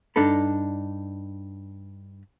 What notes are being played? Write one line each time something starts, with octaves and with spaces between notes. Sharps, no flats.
G2 D4 D#4 A4 B5